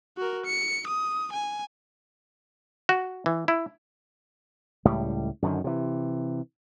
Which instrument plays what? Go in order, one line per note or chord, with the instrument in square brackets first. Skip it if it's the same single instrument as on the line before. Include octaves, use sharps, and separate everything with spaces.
[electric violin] F#4 A#4
C#7
D#6
G#5
[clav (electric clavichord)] F#4
E3
E4
[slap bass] C#2 A2 G3
F#2 D3 D#3
C3 E3